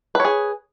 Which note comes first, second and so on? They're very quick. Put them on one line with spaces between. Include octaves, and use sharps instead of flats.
B4 C#5 G#4